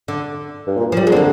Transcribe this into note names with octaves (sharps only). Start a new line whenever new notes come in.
D3
G2
A#2
F3
G3
G#3
D3 C4
A#3